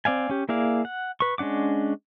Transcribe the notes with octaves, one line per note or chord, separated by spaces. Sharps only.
C4 D5 F5 G#5
C#4 G4
A#3 E4 G#4 D5 F5
F#5
B4 C#6
G#3 C#4 D4 F#5 D6